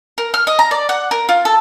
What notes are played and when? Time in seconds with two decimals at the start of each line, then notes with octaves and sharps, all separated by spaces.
0.18 A#4
0.34 F6
0.47 D#5
0.59 A#5
0.71 D5
0.89 F#5
1.11 A#4
1.29 F4
1.45 A4